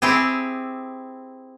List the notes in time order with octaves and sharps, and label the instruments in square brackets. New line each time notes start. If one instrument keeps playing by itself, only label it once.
[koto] C4 E4 G4 G#4